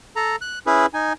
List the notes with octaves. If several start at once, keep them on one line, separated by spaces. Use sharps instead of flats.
A4 A#5
F#6
C#4 E4 G#4 B4
D#4 G#5